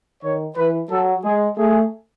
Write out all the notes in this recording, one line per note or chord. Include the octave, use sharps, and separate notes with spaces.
D#3 C#5
E3 B4
F#3 A4
G#3 G#4
A3 G#4